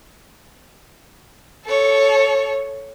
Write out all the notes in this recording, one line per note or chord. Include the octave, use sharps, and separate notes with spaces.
A4 C#5